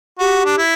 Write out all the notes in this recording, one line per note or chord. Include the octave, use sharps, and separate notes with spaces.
F#4 G4
D4
E4